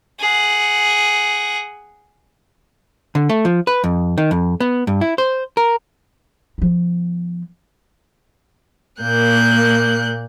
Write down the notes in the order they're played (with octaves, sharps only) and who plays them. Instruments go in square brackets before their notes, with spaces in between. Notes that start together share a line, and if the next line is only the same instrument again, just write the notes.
[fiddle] G#4 F#5
[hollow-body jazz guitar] D3
A3
F3
B4
F2
D#3
F2
B3
G2
E4
C5
A#4
[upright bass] F3 B3
[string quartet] A#2 A#3 F#6 G6